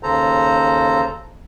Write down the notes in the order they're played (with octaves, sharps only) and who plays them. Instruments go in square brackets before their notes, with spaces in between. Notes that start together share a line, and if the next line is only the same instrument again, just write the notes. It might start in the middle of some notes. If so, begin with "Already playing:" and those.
[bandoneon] D#2 C#3 A4 C5 A#5